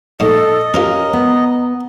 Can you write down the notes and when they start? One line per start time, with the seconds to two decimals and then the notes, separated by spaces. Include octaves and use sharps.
0.20 A#1 G#2 A4 D#5
0.74 C#4 F4 G4 A#4 B4 A#5
1.13 B3